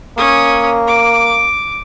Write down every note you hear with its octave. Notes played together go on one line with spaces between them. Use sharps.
A#3 C#4 D#6
D6